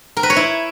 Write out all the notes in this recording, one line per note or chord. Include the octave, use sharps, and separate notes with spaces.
A#4
B4
C#5
E4